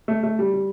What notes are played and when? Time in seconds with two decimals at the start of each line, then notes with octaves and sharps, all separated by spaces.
0.08 A3
0.23 A3
0.39 G3
0.54 G3